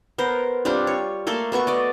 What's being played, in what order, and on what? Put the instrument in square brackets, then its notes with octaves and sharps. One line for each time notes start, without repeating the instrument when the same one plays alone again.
[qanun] B3 A#4 C5
G3 C4 D4 F4
C#5
A3 A#3 A4 C6
A3 B3 F#4 C#6
D5 D#5